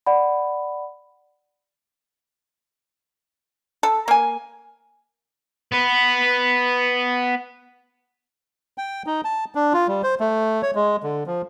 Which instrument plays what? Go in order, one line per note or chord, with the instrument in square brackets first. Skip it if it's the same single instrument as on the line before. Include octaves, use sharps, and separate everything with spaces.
[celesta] D5 F#5 B5
[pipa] A4
A#3 G#5
[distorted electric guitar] B3 B4
[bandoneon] G5
D#4
A5
D4
F4
G3
C5
A3
C#5
G#3
D3
F3